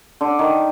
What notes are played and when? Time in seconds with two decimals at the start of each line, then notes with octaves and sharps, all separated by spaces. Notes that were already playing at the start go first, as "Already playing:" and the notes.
0.21 D3
0.39 D#3